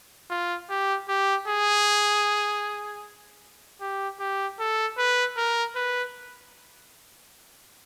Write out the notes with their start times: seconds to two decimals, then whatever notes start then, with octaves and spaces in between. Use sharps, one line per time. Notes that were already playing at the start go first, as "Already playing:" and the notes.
0.30 F4
0.70 G4
1.08 G4
1.48 G#4
3.81 G4
4.20 G4
4.59 A4
4.98 B4
5.37 A#4
5.76 B4